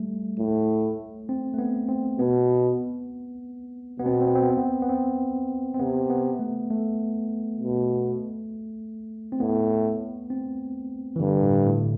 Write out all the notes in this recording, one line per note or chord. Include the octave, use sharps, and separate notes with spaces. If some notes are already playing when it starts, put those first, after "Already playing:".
Already playing: G3 A3
A2
C4
A3
B3
C4
B2 B3
B2 B3
C4
B3
C4
B3
C4
B3
C4
B3
B3
C4
C4
C3 B3
B3
A3
A3
B2
C4
A2 B3
C4
E3
G2 D3
A2
A2